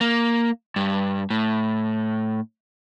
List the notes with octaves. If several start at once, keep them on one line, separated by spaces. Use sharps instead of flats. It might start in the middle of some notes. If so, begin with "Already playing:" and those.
A#3
G2
A2